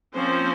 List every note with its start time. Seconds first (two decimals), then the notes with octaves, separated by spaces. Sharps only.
0.15 F3 A#3 C4 C#4 C5